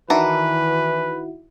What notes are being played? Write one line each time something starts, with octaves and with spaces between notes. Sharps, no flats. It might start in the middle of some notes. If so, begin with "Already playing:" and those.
D#3 E3 D4 E4 F#4 B4 A#5